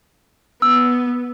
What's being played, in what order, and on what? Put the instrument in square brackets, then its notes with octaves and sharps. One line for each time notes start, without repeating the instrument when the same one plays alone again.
[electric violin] B3 [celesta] E6